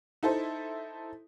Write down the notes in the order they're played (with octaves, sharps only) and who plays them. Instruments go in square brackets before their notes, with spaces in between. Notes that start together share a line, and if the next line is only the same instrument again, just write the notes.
[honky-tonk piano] D#4 E4 A4 C5